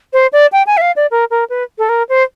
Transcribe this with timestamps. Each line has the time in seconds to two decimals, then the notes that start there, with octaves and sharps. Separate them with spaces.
0.13 C5
0.33 D5
0.52 G5
0.66 G#5
0.77 E5
0.81 F5
0.96 D5
1.11 A#4
1.31 A#4
1.49 B4
1.78 A4
1.89 A#4
2.09 C5